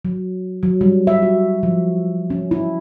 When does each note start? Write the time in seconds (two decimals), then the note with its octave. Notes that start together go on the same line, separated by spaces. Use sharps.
0.05 F#3
0.63 F#3
0.81 G3
1.07 E5
1.22 F#4
1.63 F3
2.30 C#4
2.51 E4